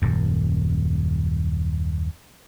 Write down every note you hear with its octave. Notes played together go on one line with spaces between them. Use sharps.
D#1 F#2